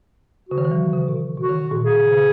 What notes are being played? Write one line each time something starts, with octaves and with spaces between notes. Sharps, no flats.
C#3 F#4
D#3
E3
F#3
C#3
B2
B2 F#4
D#3
A#2
B2 G#4
C#3
C#3